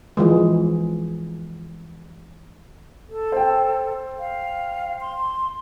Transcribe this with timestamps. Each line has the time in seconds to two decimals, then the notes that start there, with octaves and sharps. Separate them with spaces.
0.17 E3 F3 G#3
3.09 A4
3.32 C5 G5
4.19 F5
5.01 C6